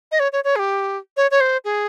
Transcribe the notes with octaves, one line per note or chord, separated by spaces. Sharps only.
D#5
C#5
C#5
C#5
G#4
G4
C#5
C#5
C5
G#4